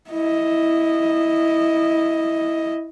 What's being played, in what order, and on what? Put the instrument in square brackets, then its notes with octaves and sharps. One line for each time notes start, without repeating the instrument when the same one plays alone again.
[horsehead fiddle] E4 D#5